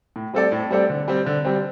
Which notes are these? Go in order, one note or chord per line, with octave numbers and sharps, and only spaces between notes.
A2
G3 C4 A4 D5
A2
G3 C4 A4 D5
D3
G3 C4
D3
G3 C4